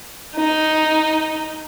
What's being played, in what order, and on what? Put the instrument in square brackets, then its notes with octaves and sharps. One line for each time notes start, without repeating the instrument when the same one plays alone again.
[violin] D#4